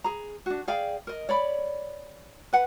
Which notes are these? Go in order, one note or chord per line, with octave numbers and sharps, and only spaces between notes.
G#4 A#5
D4 F#4
G#4 D5 F5 G5
A#4 D#5
C#5 D5 B5
B4 F#5